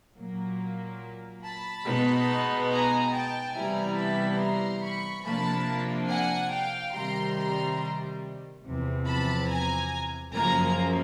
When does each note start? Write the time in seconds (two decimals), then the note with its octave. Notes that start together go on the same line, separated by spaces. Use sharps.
0.16 A#2 F#3 A#3
1.44 A5 B5
1.85 B2 G#3 B3 D#4
2.71 G#5 A#5
3.13 G5 A5
3.55 C3 E3 G3 B3 E4 G#5 A#5
3.97 A5 B5
4.40 A#5 C6
4.83 B5 C#6
5.25 C3 F3 A#3 D4 A5 B5
6.09 F#5 G#5
6.52 F5 G5
6.94 C3 D#3 G3 A#5 C6
7.37 A#5 C6
8.64 E2 C3 F3
9.06 A5 B5
9.49 G#5 A#5
10.33 F#2 C#3 F3 A#3 G#5 A#5